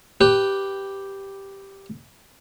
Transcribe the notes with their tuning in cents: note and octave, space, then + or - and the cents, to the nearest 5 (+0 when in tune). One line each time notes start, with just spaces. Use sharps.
G4 +0 B4 +0